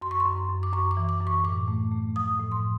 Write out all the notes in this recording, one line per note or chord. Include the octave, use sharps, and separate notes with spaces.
F#2 C6
C#6
C6
F#2
F#2
D6
F#2 C#6
D6
E3
D6
F#2
C#6
A2 D6
A3
A3
F3 D#6
A2
C6